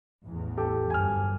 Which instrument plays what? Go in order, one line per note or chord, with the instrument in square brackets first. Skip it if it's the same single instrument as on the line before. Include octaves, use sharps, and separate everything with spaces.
[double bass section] A1 E2
[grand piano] G4 A4
[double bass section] G1 F#2 [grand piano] G#5 F6